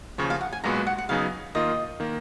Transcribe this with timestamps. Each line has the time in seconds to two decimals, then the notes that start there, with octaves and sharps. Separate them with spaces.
0.18 D#2 C#3 F3 C#5
0.30 F5
0.41 F#5
0.53 G#5
0.64 B1 A#2 G#3 B3 F#4 A#5
0.75 G#5
0.87 F#5
0.98 F#5
1.09 C#3 F#3 B3 D#4 G#4 F5
1.55 D#3 A#3 F4 D#5
2.00 D#3 A#3